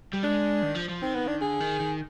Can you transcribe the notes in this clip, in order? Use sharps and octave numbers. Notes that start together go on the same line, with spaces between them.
G3
G#3 D4
D#3
F3
F3
D#3 C4
B3
D4
D3 G#4
D#3
D#3